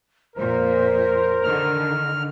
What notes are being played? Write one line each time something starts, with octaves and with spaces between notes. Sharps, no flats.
F2 A#2 A#4 C5
D3 D#3 F6